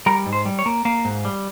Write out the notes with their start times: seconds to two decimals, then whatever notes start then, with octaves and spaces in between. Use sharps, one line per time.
0.06 G3 A#4
0.26 G#2
0.33 C5
0.45 G3
0.59 C#5
0.66 A#3
0.85 A#3 F5
1.05 G#2
1.25 G3